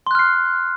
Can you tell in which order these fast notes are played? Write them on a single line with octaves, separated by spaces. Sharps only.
C6 F#6 F6 C7